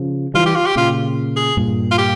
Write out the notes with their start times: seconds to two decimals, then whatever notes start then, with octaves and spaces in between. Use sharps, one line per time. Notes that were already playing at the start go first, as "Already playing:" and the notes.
Already playing: C#3 F3
0.34 E3 G3 F4
0.46 G4
0.55 F4
0.66 G4
0.75 A#2 C#3 F4
1.36 G#4
1.57 G2 A#2
1.91 F4
1.98 G4